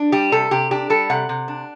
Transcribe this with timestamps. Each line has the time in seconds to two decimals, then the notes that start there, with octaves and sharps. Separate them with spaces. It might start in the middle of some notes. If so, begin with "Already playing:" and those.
Already playing: D4
0.12 G3 G4
0.32 C3 A4
0.51 C3 G4
0.71 D4 G4
0.90 G3 A4
1.10 C3 F#5
1.29 C3
1.48 D4